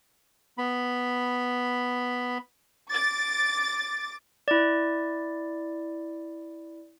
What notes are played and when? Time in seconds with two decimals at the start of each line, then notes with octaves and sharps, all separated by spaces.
0.58 B3 B5
2.91 D6 A6
4.48 E4 D5